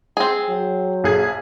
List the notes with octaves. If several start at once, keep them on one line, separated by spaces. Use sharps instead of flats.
C4 G#4
F#3
A#1 G#4 G#6